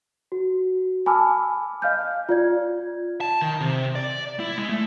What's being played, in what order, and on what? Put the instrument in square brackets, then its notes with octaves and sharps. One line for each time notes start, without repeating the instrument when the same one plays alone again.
[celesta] F#4
G#5 A5 B5 D6 E6 F6
D#5 F5 F6 G6
F4 D5 G#6
[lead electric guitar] A5
D#3
C3
D5
E4
G#3
A3